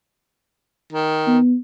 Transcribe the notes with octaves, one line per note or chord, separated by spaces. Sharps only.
D#3
B3